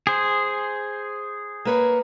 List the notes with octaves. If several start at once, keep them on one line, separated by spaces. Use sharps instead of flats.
G#4 C5
A#3 B4 C#5